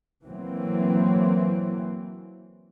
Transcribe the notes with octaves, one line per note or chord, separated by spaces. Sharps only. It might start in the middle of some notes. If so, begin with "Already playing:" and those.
E3 F#3 A#3 C4